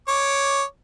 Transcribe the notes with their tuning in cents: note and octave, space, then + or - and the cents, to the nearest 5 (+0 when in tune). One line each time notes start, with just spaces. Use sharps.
C#5 +0 D6 +0